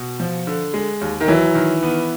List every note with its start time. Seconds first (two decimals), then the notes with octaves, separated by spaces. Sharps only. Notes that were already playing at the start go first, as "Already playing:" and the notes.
Already playing: B2
0.20 F3
0.47 D3
0.74 G#3
1.01 D#2
1.20 D#3
1.28 E3 F#3
1.55 D#3
1.83 B3